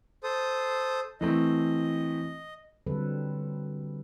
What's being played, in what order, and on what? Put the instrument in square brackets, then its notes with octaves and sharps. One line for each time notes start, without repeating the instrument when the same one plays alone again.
[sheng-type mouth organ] A4 C5 D#6
[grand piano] E3 A3 C4 [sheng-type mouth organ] D#5
[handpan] D3 F#3 G3 C4 A4 B4